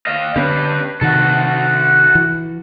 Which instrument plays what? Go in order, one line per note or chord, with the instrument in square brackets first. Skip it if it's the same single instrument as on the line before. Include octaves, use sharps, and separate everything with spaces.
[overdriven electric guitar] D#5 F5
[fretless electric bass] D3 B3 C#4 [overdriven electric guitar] G4 B4
[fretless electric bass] C3 D#3 [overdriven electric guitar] F#4 A4
[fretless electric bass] E3